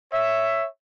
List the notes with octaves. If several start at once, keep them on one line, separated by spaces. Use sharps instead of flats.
C#5 E5